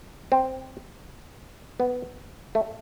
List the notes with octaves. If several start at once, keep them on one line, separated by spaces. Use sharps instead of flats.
C4
B3
A3